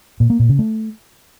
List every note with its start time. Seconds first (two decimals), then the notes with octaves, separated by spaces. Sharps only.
0.20 A#2
0.30 A#3
0.39 A#2
0.49 C#3
0.59 A3